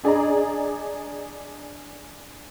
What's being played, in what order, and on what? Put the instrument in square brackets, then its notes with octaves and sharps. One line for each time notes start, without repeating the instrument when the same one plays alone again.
[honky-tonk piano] D4 G#4 D5 D#5 A#5